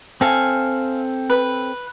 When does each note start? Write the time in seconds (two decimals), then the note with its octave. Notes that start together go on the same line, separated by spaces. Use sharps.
0.21 C4 A4 F5 G#5
1.30 B4